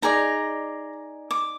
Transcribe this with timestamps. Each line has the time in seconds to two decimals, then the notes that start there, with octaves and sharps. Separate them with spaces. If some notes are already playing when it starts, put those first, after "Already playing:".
0.02 D#4 G#4 D5 A#5
1.31 D6